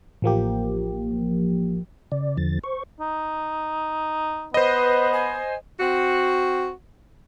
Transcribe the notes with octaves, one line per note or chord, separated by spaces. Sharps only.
A1 F3 A#3 G4
C#3 D5
E2 D3 F3 A6
C5 C#6
D#4
B3 B4 C5 D#5
G#5
C4 F#4